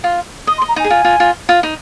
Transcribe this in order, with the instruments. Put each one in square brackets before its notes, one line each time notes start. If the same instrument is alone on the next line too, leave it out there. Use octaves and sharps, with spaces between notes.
[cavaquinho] F4
[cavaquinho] D#5 [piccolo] D#6
[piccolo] C6
[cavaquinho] D#5
[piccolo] A#5
[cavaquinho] D#4 [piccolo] G#5
[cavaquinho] G#4
[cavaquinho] F4 [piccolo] G#5
[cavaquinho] F4
F4
F4
D#4